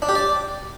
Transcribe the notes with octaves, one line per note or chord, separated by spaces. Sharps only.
D4
G4
D5